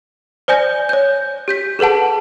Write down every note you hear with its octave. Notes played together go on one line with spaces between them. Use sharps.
C5 D5 G#5 G6 A#6
C#5 G6
G4 G6 B6
G#4 A4 B4 F#5 A5